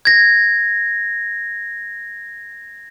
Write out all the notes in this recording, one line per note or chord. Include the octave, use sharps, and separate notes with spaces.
G#6 A#6